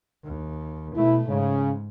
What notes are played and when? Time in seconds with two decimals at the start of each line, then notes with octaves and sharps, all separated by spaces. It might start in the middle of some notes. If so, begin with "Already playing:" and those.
0.24 D#2
0.95 B2 A3 E4
1.27 G#2 C#3